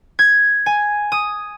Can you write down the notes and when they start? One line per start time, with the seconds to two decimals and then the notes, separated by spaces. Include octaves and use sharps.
0.19 G#6
0.66 G#5
1.12 D#6